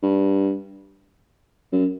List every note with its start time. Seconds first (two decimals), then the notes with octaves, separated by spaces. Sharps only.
0.03 G2
1.73 F#2